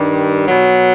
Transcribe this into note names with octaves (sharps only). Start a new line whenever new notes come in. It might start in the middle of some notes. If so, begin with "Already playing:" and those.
Already playing: G2 D#3 G3
B2 F#3